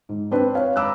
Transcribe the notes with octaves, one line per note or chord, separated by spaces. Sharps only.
G#2
C4 D4 B4
C#5 F5
A#5 B5 D6 E6 F#6